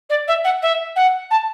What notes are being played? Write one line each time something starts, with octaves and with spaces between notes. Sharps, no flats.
D5
E5
F#5
E5
F#5
A5